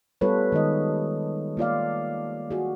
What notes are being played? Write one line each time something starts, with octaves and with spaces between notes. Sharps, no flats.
G3 B3 F4 A4 B4 C#5
D#3 G#3 D#4 D#5
A#3 F4 D5 F5
F#4 G#4